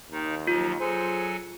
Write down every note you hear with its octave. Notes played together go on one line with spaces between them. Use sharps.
D#2 D#3 D#4
F3 F#3 F4
F#3 G#4 A4 C5 G#5